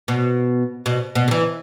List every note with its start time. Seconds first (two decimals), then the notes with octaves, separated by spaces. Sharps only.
0.08 B2
0.86 B2
1.15 B2
1.28 D3
1.31 E3